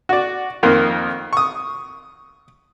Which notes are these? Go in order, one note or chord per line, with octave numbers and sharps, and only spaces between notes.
F#4 D5
F2 D#3 A#3 F4
C#6 D#6